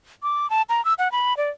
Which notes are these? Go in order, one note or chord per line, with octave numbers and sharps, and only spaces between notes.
D6
A5
A#5
E6
F#5
B5
D5